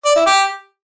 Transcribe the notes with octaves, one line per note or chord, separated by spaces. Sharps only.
D5
E4
G4